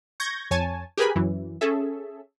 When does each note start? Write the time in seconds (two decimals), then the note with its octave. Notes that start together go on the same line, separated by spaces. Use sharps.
0.20 C#6 G6 G#6 A#6
0.51 F2 C#5 G#5 A5
0.97 G4 G#4 A#4 B4 G#5 B5
1.16 F#2 E3
1.61 C#4 G#4 A4 E5